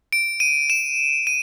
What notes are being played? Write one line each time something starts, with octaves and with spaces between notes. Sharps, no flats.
D7
D#7
E7
D#7